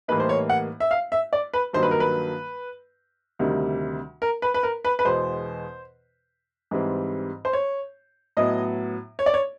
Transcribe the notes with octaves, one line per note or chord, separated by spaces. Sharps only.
A2 E3 G3 A#3 D#4 B4
C5
C#5
F#5
E5
F5
E5
D5
B4
G2 D#3 F#3 A#3 C5
B4
A#4
B4
D2 C3 D#3 G3
A#4
B4
B4
A#4
B4
B4
E2 B2 G#3 C5
G#2 E3 G3 C4
C5
C#5
A2 F#3 B3 D#5
C#5
D5
C#5